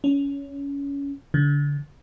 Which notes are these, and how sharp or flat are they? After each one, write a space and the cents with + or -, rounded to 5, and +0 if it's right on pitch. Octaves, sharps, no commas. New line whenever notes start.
C#4 +20
D3 -30